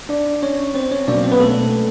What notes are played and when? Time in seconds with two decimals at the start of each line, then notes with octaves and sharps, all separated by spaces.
0.09 D4 D5
0.43 C#4 C#5
0.74 C4 C5
0.91 C#4 C#5
1.08 B2 F#3 A#3 C#4 D4 D5
1.24 C4 C5
1.32 B3 B4
1.40 A3 A4